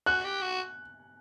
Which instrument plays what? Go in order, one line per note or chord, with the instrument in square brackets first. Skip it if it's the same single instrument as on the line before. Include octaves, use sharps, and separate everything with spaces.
[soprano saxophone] F#4 [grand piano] F#6
[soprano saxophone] G4
F#4